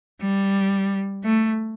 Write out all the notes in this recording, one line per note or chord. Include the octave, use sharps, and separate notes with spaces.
G3
A3